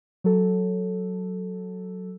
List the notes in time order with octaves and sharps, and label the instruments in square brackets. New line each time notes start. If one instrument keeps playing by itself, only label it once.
[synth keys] F#3 A4